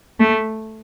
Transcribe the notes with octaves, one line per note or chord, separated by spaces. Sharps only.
A3